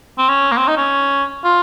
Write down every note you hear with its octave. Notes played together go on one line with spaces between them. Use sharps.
C4
C#4
A#3
C4
D#4
C#4
F4